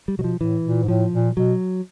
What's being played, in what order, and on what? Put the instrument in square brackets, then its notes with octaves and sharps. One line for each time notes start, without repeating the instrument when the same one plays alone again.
[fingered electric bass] G3
[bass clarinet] B2 [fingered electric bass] F#3
[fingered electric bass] F3
[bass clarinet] A2 [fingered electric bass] E3
[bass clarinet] A#2
G#2
[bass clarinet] A2 [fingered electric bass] F3
[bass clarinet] A#2
[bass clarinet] B2 [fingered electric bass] F#3